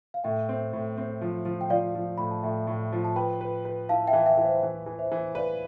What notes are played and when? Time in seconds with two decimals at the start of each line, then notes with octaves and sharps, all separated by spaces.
0.14 F5
0.24 A2 E5 G5
0.49 C4
0.73 A2
0.97 C4
1.21 F3
1.45 F3
1.61 G5
1.70 F3 D5 F5
1.95 F3
2.18 A2 B5
2.31 A5
2.43 A2 E5 G5
2.67 A2
2.92 F3
3.04 A5
3.16 B4 G5 B5
3.41 B4
3.65 B4
3.89 E4 F5 A5
4.08 E5 G5
4.13 E3
4.26 E5 G5
4.37 E3
4.45 C5
4.63 E3
4.86 E3
4.99 C5 E5
5.12 E3
5.35 B4 D5 F5